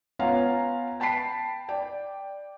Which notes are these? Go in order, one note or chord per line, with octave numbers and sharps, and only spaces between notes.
B3 C#4 F4 F5 G#5 A#5
G5 A5 B5 B6 C7 D7
D5 G5